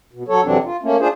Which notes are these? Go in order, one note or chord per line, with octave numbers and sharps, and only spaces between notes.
B2
F#3 A4 C#5
F2 C3 E3 F#3 C4 D4
F4
A3 A#3 C#4
D4 F4 G#4 C5